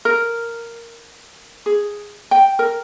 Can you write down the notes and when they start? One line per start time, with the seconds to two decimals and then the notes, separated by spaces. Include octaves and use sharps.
0.05 A#4
1.66 G#4
2.31 G5
2.59 A#4